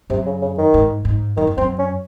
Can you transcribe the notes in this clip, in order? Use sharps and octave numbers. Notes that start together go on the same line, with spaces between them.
F#2 C3
C#3
C#3
D#3
G#2
G#2
F#2 D#3
F2
F#2 C4
C#4